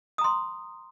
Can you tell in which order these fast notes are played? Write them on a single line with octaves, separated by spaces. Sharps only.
D#6 A#5 C6